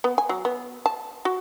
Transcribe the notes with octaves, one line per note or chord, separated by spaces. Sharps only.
B3
G#5
F#3
B3
A5
F#4